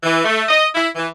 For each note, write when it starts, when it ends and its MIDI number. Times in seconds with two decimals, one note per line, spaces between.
0.03 0.22 52
0.24 0.44 57
0.49 0.66 75
0.75 0.88 64
0.96 1.06 52